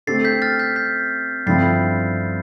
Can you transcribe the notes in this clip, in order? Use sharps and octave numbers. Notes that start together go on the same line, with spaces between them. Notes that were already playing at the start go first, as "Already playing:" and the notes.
D3 A3 C4 G4 A6 C7
G6 B6
F6 A6
G6 B6
G6 B6
G2 D3 F3 C4 E4 A6 C7